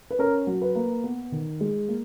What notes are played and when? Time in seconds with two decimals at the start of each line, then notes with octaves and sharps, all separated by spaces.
0.11 B4
0.19 C#4 A#4
0.47 F#3
0.62 B4
0.75 A#3
1.04 B3
1.32 D#3
1.61 G#3
1.88 A#3